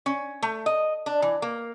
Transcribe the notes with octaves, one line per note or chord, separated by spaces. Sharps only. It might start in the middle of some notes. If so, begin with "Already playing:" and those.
C#4
A3
D#5
D4
E3
A#3